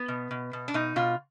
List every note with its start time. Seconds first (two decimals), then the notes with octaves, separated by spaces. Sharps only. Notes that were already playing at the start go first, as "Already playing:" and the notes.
Already playing: B3
0.08 B2
0.31 B2
0.53 B2
0.68 D4
0.74 B2 D#4
0.96 B2 F4